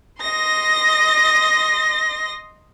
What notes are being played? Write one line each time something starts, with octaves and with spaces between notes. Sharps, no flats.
D#5 C6 A#6